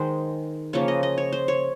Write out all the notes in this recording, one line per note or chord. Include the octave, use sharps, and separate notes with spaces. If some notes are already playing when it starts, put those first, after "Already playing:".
Already playing: D#3 G#3 C5
C#3 F3 A#3 C#5
D#5
D#5
C#5
C5
C#5